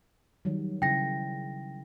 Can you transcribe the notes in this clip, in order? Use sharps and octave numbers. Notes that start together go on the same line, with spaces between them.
D#3 F#3 G3
C#3 E4 G5 A#6